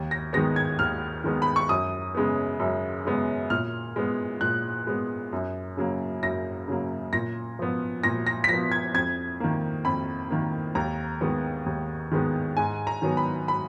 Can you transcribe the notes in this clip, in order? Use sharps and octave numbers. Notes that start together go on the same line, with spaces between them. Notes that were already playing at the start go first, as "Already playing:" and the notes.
Already playing: D#2
A#6
D#3 G#3 B3 A#6
G#6
D#2 F6
D#3 G#3 B3
B5
C#6
F#2 D#6
C#3 G#3 B3
F#2
C#3 G#3 B3
A#2 F6
G#3 B3
A#2 F#6
G#3 B3
F#2
C#3 F#3 A#3
F#2 A#6
C#3 F#3 A#3
A#2 A#6
F3 B3
A#2 A#6
A#6
B6
F3 B3 A#6
G#6
F2 G#6
D#3 A#3
F2 B5
D#3 A#3
D#2 A#5
D#3 G#3 B3
D#2
D#3 G#3 B3
G#2 G#5
A#5
D#3 F#3 B3
B5
B5